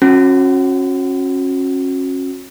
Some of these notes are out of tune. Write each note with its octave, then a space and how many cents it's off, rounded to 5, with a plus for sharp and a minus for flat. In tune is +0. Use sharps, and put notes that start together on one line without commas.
C#4 -30 F#4 -25